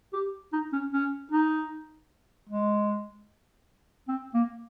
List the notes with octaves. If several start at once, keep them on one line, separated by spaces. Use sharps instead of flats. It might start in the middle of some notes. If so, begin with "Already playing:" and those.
G4
D#4
C#4
C#4
D#4
G#3
C4
A#3